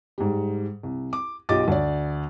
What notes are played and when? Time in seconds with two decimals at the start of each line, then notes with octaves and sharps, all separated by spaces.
0.18 G#2 G3
0.83 C2
1.13 D6
1.49 B1 F4 G4 D#5 D6 A6
1.68 D2 D5